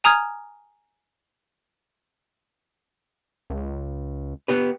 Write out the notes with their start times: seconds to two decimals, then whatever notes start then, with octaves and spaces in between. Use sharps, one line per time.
0.04 G#5 A#5 D#6 F6 G#6
3.50 C#2
4.48 B3 G4 B4